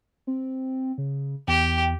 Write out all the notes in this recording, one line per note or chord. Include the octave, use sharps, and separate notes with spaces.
C4
C#3
E2 G4 G5